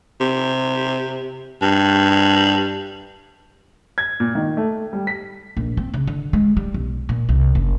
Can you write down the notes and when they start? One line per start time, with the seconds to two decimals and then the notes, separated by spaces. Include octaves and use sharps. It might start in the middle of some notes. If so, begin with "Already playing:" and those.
0.21 C3
1.62 G2
3.98 G#6
4.20 A#2
4.35 D#3
4.57 A3
4.93 G3
5.07 B6
5.57 A#1
5.77 C4
5.94 C#3
6.07 D3
6.33 G#3
6.57 G3
6.74 B1
7.09 A#2
7.29 C2
7.55 F#1